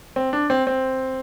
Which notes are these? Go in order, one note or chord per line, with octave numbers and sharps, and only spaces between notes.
C4
D4
C4
C4